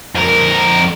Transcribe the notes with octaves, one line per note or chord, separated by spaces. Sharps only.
F2 A#4